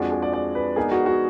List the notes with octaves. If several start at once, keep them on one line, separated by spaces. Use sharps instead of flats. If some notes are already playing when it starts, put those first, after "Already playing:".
Already playing: F2 F3 G#3 D4 F#4
G#4
D5
D5
B4
G#3 B3 D#4 G#4 A#4 D5
F#4
F#4